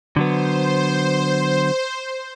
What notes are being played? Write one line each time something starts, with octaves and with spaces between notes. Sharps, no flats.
D3 F#3 B3 C5